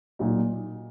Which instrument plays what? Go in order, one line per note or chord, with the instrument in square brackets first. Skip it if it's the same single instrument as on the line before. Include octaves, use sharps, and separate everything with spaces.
[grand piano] A#2 F#3 D#4